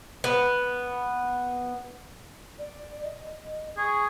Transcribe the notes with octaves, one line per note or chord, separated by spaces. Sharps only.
B3
D5
D#5
G#4 C#6